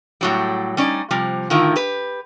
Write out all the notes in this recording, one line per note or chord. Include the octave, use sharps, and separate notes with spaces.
A2 F#3 G3
G3 C#4 D#4 D5
C3 F3 G3
A2 D3 D#3 E4 F4
G4 B4